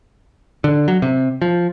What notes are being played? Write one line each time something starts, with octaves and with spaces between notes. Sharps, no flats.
D3
F#3
C3
F3